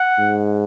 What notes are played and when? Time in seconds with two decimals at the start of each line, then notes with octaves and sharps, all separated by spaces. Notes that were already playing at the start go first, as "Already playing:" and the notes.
Already playing: F#5
0.19 G#2